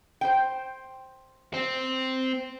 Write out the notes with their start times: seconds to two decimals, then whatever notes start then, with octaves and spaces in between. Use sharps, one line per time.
0.21 C5 G5
1.54 C4